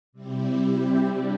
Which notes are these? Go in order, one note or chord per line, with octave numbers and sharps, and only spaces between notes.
C3 G3 C4 E4 G4
G3 D4 G4